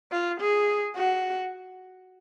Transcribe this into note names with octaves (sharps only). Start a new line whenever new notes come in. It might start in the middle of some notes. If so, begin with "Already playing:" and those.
F4
G#4
F#4